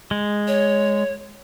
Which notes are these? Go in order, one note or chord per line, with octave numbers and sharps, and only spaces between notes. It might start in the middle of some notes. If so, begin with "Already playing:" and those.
G#3
C#5